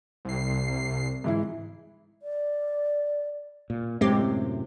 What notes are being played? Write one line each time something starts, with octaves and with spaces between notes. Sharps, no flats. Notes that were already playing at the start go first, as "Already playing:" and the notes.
C2 C7
G#2 E3 E4
D5
A#2
F#2 A2 C3 G#3 C4 G4